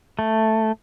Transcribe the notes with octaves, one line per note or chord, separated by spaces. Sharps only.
A3